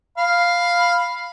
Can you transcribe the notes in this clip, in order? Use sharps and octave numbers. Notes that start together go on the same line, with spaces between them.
F5 B5